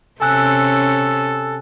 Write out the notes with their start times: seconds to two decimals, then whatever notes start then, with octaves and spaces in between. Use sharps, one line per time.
0.22 C3 C#4 A4 G#5 E6 F#6